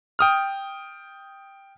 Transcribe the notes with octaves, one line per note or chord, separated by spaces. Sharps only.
G5 D#6 F6